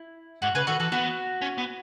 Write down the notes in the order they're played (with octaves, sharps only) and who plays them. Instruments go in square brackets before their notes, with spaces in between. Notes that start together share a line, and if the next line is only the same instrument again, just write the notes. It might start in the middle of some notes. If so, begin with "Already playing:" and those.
Already playing: [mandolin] E4
[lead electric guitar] G#2 [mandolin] F#4
[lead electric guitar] C#3 [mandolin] G#4 B4
[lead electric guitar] D#3 [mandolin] F#4 A4
[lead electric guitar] E3 [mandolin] F#4 A4
[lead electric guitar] B3 [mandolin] F#4
[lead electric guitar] C#4
B3